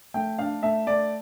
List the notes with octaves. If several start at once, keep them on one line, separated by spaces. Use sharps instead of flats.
A3 G5
D4 F5
A3 E5
A3 D5